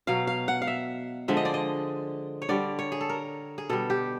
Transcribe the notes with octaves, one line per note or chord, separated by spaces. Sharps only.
B2 F#3 F5
F5
F#5
F5
E5
D3 F3 G#3 E5
D#5
D5
D#5
C#5
D3 G3 D5
C#5
G#4
A4
A#4
G#4
B2 G3 A4
G4